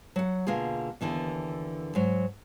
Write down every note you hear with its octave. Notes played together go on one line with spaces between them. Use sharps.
F#3 F#5
B2 D3 A#3 F4 G#4
D#2 D3 E3 B3
G#2 F#3